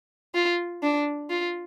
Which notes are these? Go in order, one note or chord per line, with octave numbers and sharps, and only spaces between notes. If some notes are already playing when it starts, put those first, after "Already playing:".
F4
D4
F4